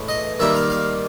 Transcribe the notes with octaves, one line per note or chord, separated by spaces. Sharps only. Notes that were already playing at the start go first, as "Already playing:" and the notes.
Already playing: A2 E3 G#3
D#5
D#3 G3 A#3 E5
F5
F5